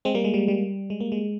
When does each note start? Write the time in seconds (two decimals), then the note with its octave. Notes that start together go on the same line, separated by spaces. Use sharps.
0.05 G#3 C4
0.14 G3 A#3
0.24 G#3
0.34 G3
0.48 G3
0.90 G#3
1.00 A#3
1.12 G#3